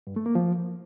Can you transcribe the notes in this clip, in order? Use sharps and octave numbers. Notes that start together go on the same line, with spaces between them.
G2
A3
A#3
F3